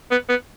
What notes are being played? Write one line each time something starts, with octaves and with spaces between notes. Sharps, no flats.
B3
B3